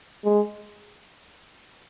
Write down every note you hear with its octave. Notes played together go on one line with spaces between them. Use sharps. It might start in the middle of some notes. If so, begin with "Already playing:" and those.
G#3